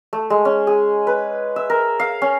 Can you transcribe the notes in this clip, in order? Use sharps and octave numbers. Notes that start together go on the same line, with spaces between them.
A3
G#3
C#4
G#4
B4
E5
A#4
F5
C#4